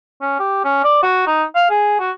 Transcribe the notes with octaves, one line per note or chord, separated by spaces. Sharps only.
C#4
G4
C#4
D5
F#4
D#4
F5
G#4
F#4